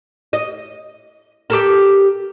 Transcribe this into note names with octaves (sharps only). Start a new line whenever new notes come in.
D#5
G4 A4 A#4